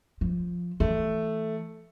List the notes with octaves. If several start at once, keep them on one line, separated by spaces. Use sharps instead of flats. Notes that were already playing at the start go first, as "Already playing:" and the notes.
F3
E3 A3